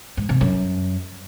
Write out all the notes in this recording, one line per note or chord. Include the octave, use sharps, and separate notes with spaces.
G#2
C3
F#2